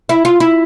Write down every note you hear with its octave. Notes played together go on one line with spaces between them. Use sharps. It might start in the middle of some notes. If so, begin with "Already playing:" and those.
E4
F4
E4